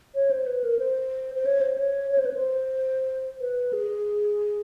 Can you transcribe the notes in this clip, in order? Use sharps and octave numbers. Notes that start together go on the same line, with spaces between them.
C#5
C5
B4
A#4
C5
C5
C#5
C5
C#5
C#5
C5
B4
C5
B4
G#4